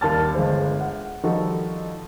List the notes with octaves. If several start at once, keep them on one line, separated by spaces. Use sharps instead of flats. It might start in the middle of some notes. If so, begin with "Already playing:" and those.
D#2 G3 A#3 A5 F6 A6
G1 G#3 C5
F#5
D#3 F3 G3 D#4 F#4 A4